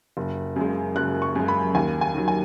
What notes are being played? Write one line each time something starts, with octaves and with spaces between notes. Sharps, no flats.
F#1
F#2 C#3 G#3
F#1 F#6
C#6
F#2 C#3 G#3
B5
D#2 G#5
G#5
D#3 F#3
G#5